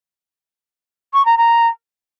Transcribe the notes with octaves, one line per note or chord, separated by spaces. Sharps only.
C#6
A#5
A#5